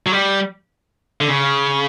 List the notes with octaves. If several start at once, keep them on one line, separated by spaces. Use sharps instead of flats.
F#3
G3
D3
C#3